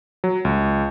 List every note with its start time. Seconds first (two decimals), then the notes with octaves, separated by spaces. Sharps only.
0.24 F#3
0.45 C#2